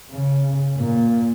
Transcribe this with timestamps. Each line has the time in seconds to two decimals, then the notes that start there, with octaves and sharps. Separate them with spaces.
0.11 C#3
0.78 A#2